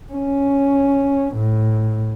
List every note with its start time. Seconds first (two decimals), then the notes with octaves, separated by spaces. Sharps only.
0.13 C#4
1.35 A2